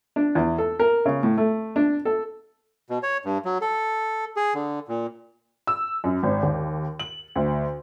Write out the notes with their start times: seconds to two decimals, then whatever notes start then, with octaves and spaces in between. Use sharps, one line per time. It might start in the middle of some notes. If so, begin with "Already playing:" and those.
0.16 D4
0.35 E2
0.58 A4
0.79 A#4
1.06 C#3
1.23 A2
1.38 A3
1.76 D4
2.05 A4
2.90 B2
3.03 C#5
3.25 G2
3.45 F#3
3.61 A4
4.37 G#4
4.54 D3
4.88 A#2
5.67 E6
6.04 F#2
6.23 G#1
6.43 D#2
7.00 F#7
7.35 D2